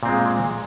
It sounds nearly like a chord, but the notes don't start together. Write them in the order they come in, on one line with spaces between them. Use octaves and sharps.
A#2 C4 G#3